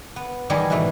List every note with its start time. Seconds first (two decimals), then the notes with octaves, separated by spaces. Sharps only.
0.16 B3
0.50 E2 D#3 G3 G#4 D#5 B5
0.70 G#2 B2 E3 A3